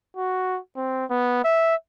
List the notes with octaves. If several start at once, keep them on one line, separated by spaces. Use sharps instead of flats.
F#4
C4
B3
E5